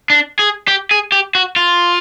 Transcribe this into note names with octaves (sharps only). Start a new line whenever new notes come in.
D4
G#4
G4
G#4
G4
F#4
F4